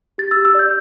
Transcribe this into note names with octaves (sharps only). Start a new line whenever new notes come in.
G4 A6
E6
G4
E6
D5 G6